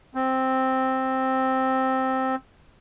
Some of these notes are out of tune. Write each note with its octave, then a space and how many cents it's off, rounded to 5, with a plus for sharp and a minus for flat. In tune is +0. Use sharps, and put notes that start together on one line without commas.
C4 +0